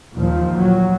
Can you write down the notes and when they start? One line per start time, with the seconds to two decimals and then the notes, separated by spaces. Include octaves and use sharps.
0.17 D#2 A#2 F3
0.58 F#3